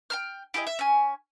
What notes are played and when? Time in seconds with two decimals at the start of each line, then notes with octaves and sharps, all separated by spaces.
0.10 G5 A#5 F6
0.54 E4 G4 G#4 D#5
0.67 E5
0.79 C#4 G#5